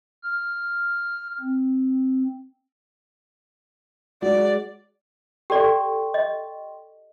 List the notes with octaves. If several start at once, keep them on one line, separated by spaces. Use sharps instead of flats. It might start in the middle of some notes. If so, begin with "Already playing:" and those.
F6
C4
G#3 F#4 D5
G4 A4 D5 G5 C6 C#6
D#5